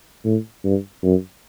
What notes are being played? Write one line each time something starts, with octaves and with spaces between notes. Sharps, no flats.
A2
G2
F#2